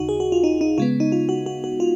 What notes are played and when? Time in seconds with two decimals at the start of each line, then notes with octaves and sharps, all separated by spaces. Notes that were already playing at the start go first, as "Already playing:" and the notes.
Already playing: D#2 C#3 D#4 F#4
0.09 G#4
0.20 F#4
0.32 F4
0.44 D#4
0.61 D#4
0.78 C#3 G#3 B3 F4
1.00 D#4
1.12 F4
1.29 F#4
1.46 F#4
1.64 F#4
1.80 F4